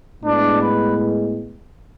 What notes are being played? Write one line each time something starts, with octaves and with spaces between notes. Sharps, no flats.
A2 G#3 B3 D4
B4